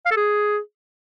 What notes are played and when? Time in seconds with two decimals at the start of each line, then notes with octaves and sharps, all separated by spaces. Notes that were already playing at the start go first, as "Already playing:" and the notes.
0.06 F5
0.11 A4
0.17 G#4